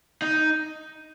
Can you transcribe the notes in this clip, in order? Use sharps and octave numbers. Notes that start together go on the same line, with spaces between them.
D#4